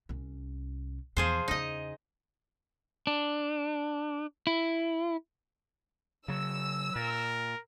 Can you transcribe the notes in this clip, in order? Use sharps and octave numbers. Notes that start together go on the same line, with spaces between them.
C2 C#4
E2 B2 F3 G#4 C5
E2 C#3 D#4 D#5
D4
E4
C#3 F#3 E6
A#2 A#4